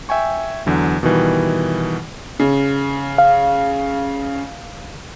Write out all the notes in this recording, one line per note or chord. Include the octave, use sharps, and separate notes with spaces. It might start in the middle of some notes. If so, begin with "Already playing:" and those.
E5 G5 G#5 C#6
E2 D3 F#3
B2 D#3 E3 G3
C#3
F5